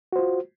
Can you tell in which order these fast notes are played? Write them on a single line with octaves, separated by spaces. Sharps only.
F#4 C5 F4